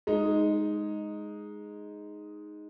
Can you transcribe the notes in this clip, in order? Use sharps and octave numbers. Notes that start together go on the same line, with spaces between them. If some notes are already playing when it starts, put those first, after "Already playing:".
G#3 D#4